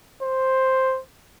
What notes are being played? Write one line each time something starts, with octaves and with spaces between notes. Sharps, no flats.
C5